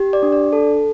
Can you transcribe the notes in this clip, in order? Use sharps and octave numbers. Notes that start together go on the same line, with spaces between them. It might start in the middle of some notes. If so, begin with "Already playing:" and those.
Already playing: G4
D5
D4
D5
A4